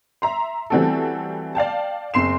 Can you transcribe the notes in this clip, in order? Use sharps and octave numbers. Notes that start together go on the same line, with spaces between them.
E5 A#5 C6
E3 G3 A3 C4 F#4 A4
D5 F5 G5 A5
F#1 C4 C6 C7 E7